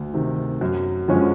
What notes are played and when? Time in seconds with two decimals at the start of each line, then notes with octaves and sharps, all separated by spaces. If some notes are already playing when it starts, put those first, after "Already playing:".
Already playing: D2
0.14 C3 D#3
0.61 F#2
1.08 D3 F3 G#3 C#4